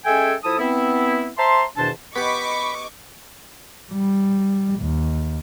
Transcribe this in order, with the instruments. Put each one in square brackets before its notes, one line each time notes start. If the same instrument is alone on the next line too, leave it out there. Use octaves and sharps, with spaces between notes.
[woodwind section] G#3 C#4 A4 E5 G5 G#5
F3 E4 A4 A5 D#6
B3 C4 E4
C5 E5 A5 A#5 C6
E2 B2 D#3 D4 C5 A5
[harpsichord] B3 G4 [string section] D#5 C#6 D6 [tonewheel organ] B5
[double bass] G3
D#2